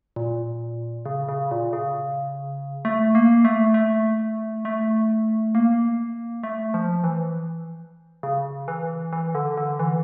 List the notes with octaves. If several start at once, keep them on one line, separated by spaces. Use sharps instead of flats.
A#2
C#3
C#3
A#2
C#3
A3
A#3
A3
A3
A3
A#3
A3
F3
E3
C#3
E3
E3
D3
D3
E3